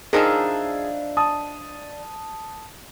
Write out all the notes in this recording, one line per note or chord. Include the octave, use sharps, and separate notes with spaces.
D#3 F3 D4 D#4 G#4 E5 F5
A5 D#6